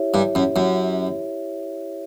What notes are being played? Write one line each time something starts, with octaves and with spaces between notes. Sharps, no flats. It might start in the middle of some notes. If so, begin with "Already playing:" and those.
Already playing: E4 G4 C#5 E5
G2
F#2
F#2